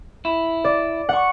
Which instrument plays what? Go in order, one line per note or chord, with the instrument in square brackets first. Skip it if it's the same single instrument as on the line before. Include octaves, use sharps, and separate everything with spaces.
[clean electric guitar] E4
[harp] D5
F#5 C#6